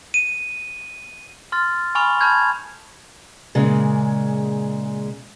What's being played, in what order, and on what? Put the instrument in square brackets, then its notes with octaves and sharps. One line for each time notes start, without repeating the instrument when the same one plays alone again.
[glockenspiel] D#7
C6 F6 A6
G#5 B5 C#6 D#6 F6 F7
A5 B5 C#6 F6 G6 G#6
[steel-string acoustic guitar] A#2 C#3 G#3